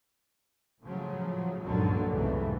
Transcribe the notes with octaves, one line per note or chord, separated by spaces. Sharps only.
A2 C#3 F3 F#3
C#2 G2 A#2 D3 D#3 F#3
C2 F2 G#2 C#3 E3 A3